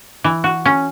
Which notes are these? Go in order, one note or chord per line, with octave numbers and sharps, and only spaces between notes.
E3
F#4
C#4